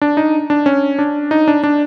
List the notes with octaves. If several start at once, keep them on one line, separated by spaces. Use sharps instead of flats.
D4
D#4
D4
C#4
D4
D#4
D4
D4